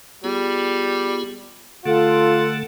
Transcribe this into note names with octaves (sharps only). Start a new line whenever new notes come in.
G3 B3 F4 G#4
D3 A3 F4 A4 F#5